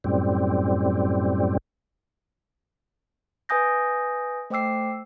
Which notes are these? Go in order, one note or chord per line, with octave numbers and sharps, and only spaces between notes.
F#2 A2 G3 C4
B4 E5 G#5 D#6 G6 A#6
A3 C5 G5 D6 E6 C7